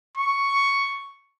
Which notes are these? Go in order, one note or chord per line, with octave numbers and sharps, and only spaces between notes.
C#6